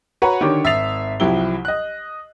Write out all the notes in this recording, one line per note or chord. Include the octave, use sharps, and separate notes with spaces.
F#4 B4 C#5 F#5 A#5
D3 D#3 D4 G4 C#5 D6
G#1 E5 D#6 A6 C7 F7
C2 F3 F#3 E4 G4 G7
D#5 F#6